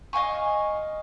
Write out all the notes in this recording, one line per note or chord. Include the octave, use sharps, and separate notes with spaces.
D#5 F5 G#5 C#6